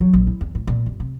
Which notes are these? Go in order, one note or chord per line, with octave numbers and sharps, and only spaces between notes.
F#3
A#1
E4
E2
A2
A#2
G1
C3